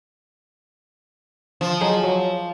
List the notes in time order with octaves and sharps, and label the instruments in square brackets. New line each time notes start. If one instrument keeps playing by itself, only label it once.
[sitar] F3
[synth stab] F#3 D#4 G#4
F#3